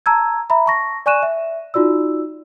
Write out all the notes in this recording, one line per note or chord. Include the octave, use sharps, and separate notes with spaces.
A5 A#5 E6 G#6
E5 A#5 B5
A5 C#6 A#6
D5 G#5 C#6 F#6 D#7 E7
E5
D#4 F4 F#4 D5 E6